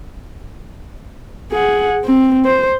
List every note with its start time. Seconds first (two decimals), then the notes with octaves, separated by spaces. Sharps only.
1.52 G#4 F#5
2.05 C4
2.45 C5